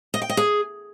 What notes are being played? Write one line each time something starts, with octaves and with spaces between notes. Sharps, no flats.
D#5
G5
D#5
G#4